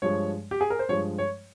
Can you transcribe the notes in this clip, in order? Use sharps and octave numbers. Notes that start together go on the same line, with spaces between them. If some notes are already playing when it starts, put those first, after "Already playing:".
G2 F3 G#3 C#5
G4
G#4
A#4
C5
G2 F3 G#3 C#5
C#5